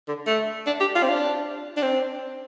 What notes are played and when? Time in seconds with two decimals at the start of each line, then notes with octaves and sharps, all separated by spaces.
0.08 D3
0.27 A3
0.66 D4
0.80 G4
0.95 F4
1.03 C4
1.09 D4
1.77 D4
1.83 C4